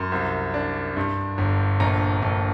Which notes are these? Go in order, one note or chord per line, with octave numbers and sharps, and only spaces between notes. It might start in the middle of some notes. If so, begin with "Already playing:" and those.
Already playing: F#2 C6
C2
D4
G2
G1
A#1 A#5
A#1